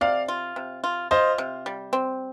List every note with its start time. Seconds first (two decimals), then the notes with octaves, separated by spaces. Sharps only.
0.01 C3 D5 F5
0.28 F4
0.56 C3
0.84 F4
1.11 F4 C5 D#5
1.38 C3
1.66 G3
1.93 C4